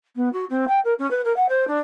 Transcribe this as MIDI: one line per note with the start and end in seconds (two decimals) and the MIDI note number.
0.16 0.32 59
0.33 0.45 66
0.50 0.65 60
0.68 0.80 79
0.85 0.94 70
0.99 1.09 61
1.11 1.21 71
1.25 1.35 70
1.37 1.46 78
1.49 1.67 72
1.68 1.79 62